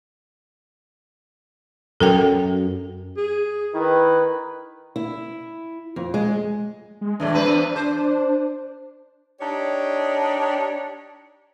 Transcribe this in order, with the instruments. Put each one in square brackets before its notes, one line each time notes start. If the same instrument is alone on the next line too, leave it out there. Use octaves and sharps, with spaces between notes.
[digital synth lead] F#2 [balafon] A4 A#4 G5
[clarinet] G#4
[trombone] D#3 [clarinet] E4 [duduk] B4
[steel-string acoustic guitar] E4
F2
G#3
[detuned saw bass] G#3
[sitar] F2 A2 E3 [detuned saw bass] D4
[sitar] E2 C4 B4
C5
[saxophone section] D4 D#4 G4 C#5